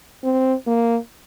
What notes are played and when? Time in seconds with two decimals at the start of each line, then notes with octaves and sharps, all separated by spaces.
0.24 C4
0.67 A#3